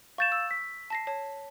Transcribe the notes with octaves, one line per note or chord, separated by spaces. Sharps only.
F5 C#6 G6 A6 E7
E6
B6
A5 A#6 C7
C#5 A5